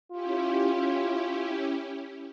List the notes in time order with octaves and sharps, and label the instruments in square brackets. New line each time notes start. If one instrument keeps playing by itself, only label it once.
[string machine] C#4 E4 G4 [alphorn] F4